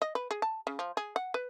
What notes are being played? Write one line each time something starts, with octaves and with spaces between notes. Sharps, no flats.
D#5
B4
G#4
A5
C#3
F3
G#4
F#5
B4